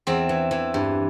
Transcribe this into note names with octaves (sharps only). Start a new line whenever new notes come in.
E2 C4
E3
E3
G2